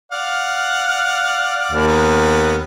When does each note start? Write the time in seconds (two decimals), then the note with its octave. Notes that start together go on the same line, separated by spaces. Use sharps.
0.12 D5 F5 F#5 F6
1.72 D#2
1.87 B3